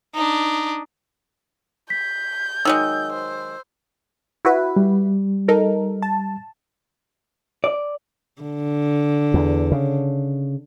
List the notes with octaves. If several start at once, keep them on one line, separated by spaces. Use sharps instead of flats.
D4 D#4
G6 B6
D#3 F#3 G#3 E6
C5
E4 F#4 B4
G3
D#4 A4 A#4
A5
D5
D3
E2
C#3